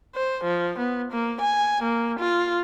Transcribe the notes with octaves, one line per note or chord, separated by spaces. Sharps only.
C5
F3
B3
A#3
G#5
A#3
F4